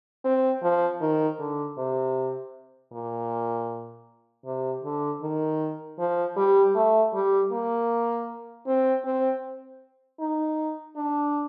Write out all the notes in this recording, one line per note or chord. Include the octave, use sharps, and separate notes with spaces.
C4
F3
D#3
D3
C3
A#2
C3
D3
D#3
F3
G3
A3
G3
A#3
C4
C4
D#4
D4